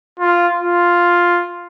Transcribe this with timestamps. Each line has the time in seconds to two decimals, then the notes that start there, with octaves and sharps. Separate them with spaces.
0.20 F4
0.59 F4